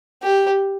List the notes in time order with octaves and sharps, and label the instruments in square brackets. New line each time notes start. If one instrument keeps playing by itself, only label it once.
[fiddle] G4